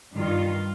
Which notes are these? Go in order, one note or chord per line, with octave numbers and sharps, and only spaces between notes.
G2 D#3 G3 F4